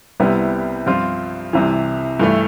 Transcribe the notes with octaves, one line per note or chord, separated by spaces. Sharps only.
C2 C3 G3 B3 E4
G2 F3 C4 F4
C2 C3 E3
G2 E3 A3 E4